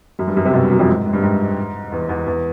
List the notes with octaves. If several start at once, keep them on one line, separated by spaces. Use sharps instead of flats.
F#2
G2
F#2
C3
B2
G2
F#2
F2
G#2
G#2
G2
G#2
E2
E2
E2